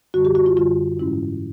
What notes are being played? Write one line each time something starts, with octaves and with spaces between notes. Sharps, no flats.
F#2 D3 G3 F#4
G4
F#4
F4
F#2 D3 G3 F4
G#2 E3 G#3 C#4 E4